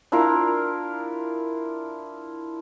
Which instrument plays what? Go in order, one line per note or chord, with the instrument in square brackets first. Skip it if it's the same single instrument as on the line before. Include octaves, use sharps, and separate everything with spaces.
[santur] D4 E4 F4 A#4